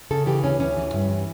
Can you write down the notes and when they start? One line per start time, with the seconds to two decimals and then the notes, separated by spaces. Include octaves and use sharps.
0.11 C#3 A4
0.26 E3 G4
0.43 D2 C#4
0.60 D2 C#4
0.77 E3
0.93 G2
1.10 E3